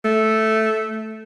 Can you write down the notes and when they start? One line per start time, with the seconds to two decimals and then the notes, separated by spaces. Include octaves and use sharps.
0.05 A3